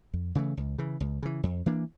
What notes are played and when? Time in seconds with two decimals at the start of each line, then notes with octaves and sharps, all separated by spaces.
0.14 F2
0.35 C#3 E3 A3
0.57 C#2
0.78 C#3 E3
1.00 C#2
1.23 C#3 E3
1.43 F2
1.66 E3 A#3 D4